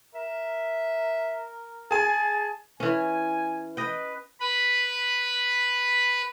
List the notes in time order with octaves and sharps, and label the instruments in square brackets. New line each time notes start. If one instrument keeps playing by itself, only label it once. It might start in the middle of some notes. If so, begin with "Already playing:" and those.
[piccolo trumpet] A#4 [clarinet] E5
[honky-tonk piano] G#4 G#5 [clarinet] A5
[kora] E3 C#4 [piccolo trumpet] G#5
[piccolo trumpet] B4 [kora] D#5 G5
[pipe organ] B4 B5